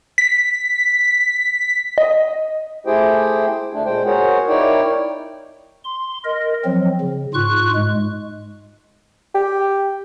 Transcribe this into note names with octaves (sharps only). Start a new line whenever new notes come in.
B6
D#5
A3 E4 G4 G#4 C5 G5
D2 A3 D4
A#2 G#3 C5 G5
F#4 G#4 A#4 C5 C#5 F#5
D#4 E4 A#4 C#5 D5 G5
C6
A#4 D#5
F3 F#3 C4
C#3
G#2 F4 C#6 F#6
G#2 G#3
G4